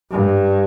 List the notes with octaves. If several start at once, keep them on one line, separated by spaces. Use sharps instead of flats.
G2